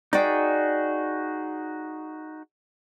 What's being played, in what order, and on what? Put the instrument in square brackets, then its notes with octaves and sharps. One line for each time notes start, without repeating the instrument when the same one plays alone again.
[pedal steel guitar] D#4 F#4 G#4 [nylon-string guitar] D5 G5